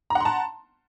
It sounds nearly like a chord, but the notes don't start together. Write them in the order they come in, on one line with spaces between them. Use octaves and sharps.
A#5 F#5 C6 A5